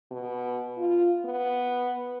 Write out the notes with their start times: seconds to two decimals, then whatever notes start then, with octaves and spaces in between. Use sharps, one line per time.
0.11 B2
0.77 F4
1.25 B3